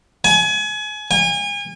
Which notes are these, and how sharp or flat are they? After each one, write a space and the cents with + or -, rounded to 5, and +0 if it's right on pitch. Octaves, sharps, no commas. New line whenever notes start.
G#5 +30
G#5 -35